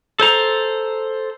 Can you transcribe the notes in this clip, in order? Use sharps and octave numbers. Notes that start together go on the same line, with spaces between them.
A4 C5 A#5